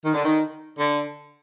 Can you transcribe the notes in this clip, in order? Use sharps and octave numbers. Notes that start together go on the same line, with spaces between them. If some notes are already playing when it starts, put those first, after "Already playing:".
D#3
D3
D#3
D3